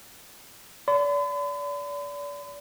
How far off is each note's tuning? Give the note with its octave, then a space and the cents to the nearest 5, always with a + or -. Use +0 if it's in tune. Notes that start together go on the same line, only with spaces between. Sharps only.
D5 -35 B5 +45